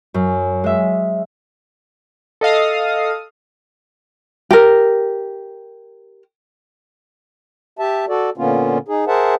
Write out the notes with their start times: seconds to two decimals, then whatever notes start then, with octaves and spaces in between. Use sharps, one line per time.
0.14 F#2
0.64 G#3 E5
2.41 A4 D#5 F5 D#6
4.51 G4 A#4
7.79 G4 E5 A5
8.08 F#4 A4 D5
8.37 A#2 D3 A#3 B3 C#4 F4
8.88 D#4 G#4
9.07 G#4 A#4 C5 E5 F#5 A5